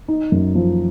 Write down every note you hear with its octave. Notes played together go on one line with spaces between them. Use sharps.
D#4
F#2
F3